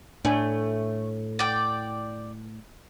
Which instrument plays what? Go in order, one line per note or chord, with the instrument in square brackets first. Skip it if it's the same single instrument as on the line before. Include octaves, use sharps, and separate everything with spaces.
[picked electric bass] A2 [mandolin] A3 [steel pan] D4 G#5
[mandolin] D5 G5 [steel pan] F#5